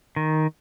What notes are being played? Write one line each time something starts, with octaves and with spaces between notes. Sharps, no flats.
D#3